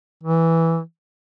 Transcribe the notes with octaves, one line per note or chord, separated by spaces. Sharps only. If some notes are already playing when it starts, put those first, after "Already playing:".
E3